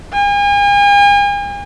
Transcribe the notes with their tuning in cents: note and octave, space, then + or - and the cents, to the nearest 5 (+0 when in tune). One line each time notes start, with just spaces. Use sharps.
G#5 -40